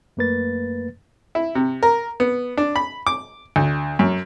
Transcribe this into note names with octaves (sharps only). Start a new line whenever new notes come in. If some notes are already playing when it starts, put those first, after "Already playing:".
F#2 A3 A#3 B4 A6
E4
C3
A#4
B3
D4
B5
D6
D2
F#2